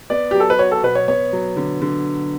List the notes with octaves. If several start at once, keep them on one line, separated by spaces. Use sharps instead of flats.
B3 D5
F#3 G4
A4
B4
F#4 C#5
A4
B2 B4
C#5
B3 C#5
F#3
D3
D3